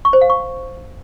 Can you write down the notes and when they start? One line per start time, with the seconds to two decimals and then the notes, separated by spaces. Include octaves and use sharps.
0.05 C#6
0.13 C5
0.21 F5
0.30 C#6